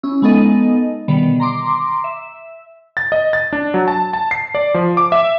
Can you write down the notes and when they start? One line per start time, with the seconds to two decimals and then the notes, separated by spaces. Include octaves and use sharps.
0.03 C#4 E4
0.22 G#3 B3 D#4 A4 D#5
1.08 B2 D3 D#3 G3 B3
1.40 A#5 C6 D6
2.04 E5
2.97 A6
3.12 D#5
3.33 A6
3.53 D4
3.74 F#3
3.88 A5
4.13 A5
4.31 C7
4.55 D5
4.74 F3
4.97 D6
5.12 E5